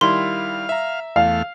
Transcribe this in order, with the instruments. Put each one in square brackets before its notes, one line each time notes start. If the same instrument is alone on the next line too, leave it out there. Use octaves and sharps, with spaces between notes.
[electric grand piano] D#3 G3 E4 [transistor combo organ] F5 [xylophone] C6
[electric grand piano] E5 A#5
[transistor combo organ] E2 A3 F6 [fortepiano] F5